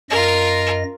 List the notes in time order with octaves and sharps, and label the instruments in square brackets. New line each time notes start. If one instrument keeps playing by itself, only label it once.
[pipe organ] F#2 D#5 A#6 [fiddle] F4 A#4